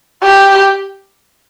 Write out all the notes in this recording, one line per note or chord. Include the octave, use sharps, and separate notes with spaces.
G4